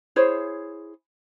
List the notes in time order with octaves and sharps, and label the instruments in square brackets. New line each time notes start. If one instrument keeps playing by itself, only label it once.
[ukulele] E4 G#4 C5 C#5